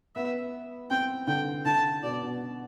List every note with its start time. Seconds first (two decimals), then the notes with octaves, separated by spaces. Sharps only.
0.15 B3 E5
0.90 C4 G5
1.27 D3 G5
1.65 D3 A5
2.03 B2 D5
2.22 B2